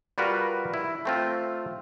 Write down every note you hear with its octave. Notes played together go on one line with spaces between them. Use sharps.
G3 F4 F#4 A#4 B4
E4
A3 C4 F4